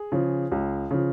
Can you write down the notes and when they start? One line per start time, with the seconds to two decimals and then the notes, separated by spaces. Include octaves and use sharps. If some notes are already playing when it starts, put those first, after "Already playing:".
Already playing: G#4
0.12 C#3 F3
0.52 C#2
0.91 C#3 F3